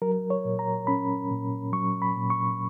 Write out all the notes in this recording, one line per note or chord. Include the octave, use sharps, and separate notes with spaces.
F#3 A#4
C#5
A#2
A#5
C#4 B5
A#2
F#3 C#6
B5
A#2
C#6